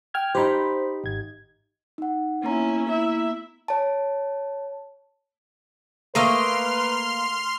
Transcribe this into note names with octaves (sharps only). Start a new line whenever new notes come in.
G5 F6 G#6
D#4 G4 C5 B5
G#1 G#6
D#4 F#5
A#3 B3 C#4 E4 A#5
E4 E5
C#5 A5
A3 A#3 B4 D#5 F5 C6 F6